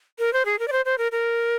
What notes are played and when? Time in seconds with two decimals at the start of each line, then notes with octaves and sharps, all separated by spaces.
0.19 A#4
0.33 C5
0.45 G#4
0.59 A#4
0.68 D5
0.72 C5
0.85 C5
0.98 A#4
1.12 A#4